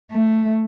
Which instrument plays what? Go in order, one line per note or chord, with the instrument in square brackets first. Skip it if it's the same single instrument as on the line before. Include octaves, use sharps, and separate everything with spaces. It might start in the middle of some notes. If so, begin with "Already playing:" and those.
[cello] A3